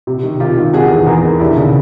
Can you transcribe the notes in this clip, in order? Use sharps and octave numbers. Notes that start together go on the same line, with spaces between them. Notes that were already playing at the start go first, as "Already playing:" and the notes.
C3
D#3
C3 F4 G4
D#3
C3 F#4 G#4
E2
E2 G#4 A#4
D#3
D#2 D4 E4
C#3